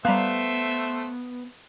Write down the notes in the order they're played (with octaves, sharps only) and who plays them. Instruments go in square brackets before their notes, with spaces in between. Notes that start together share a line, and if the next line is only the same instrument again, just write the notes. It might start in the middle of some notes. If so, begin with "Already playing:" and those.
[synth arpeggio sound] G3 A#5 F#6 [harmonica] A3 C5 E5 [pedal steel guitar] B3 [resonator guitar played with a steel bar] F5